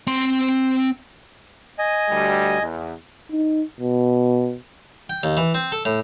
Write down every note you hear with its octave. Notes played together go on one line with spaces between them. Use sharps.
C4 C6
D#5 G#5
D2 G3
E2
D#4
B2
G5
D#2
E3
C4
A4
A2